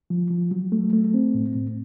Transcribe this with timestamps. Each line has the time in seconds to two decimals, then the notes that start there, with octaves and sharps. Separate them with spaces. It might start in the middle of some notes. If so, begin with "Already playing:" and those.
0.10 F3
0.31 F3
0.51 F#3
0.72 A3
0.93 A3
1.14 C4
1.34 A2
1.55 A2